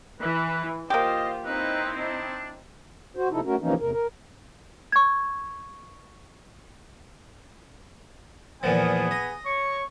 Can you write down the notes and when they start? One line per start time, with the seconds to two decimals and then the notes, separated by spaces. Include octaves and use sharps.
0.20 E3 B4
0.90 A#3 F4 G4 C5 D#5
1.45 C4 D#4 E4 B4
2.00 D4
3.16 F#4 C5
3.31 C3 F3 D#4 E4 A4
3.45 A3 C#4 F#4 A#4
3.61 C3 E3 F3 A#3 C#4 D#4
3.80 E2 A2 C3 A#4
3.92 A#4
4.92 C#6 G#6
8.63 E2 A#2 F3 B3 G#4 G#5
9.11 D#5
9.46 C#5 C#6